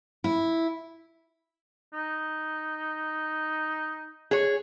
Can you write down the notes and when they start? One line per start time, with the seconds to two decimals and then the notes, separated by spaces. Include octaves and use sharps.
0.24 E4
1.93 D#4
4.31 G#4 C#5